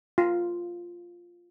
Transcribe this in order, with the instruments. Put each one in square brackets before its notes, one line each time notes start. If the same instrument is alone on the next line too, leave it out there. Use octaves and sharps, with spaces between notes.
[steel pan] F4